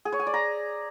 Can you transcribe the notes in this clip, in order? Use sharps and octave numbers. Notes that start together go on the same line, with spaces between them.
G#4
C#5
G#5
D5
A#5